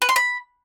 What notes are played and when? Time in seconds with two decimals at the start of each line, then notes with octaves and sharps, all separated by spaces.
0.02 B4
0.09 C6
0.16 B5